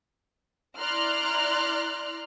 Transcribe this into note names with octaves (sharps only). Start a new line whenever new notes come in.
E4 D5 A#5 C6 F6 F#6